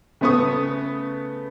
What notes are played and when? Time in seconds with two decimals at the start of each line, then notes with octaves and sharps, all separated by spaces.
0.21 C#3 A3 B3 C#6 D#6